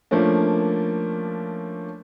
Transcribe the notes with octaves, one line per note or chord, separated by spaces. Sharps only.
F3 A3 A#3 C#4 D4